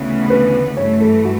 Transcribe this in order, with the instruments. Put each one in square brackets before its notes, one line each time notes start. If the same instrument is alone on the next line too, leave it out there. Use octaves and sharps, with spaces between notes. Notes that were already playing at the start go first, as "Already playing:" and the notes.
Already playing: [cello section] D2 C#3 E3 B3
[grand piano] B4
[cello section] G2 E3 A3 [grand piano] C#5
[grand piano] A4
F#4